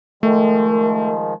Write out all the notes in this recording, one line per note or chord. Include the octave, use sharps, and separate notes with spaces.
D#3 F3 G#3 A3 A#4